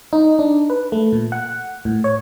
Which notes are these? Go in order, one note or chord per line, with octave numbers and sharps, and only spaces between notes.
D#4
D4
B4
A3
A#2
F#5
A2
C#5